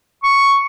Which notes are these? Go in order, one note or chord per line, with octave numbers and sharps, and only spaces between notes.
C#6